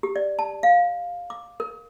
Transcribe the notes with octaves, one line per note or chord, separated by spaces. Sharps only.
G4
D5
A5
F5
D6
A#4